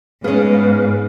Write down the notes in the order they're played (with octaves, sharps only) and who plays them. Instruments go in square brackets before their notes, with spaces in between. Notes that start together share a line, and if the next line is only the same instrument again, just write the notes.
[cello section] G#2 [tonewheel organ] B3 B4 F5 [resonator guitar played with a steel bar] C#4 G#4